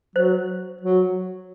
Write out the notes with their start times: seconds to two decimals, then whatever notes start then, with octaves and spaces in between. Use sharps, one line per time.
0.16 F#3 C5
0.82 F#3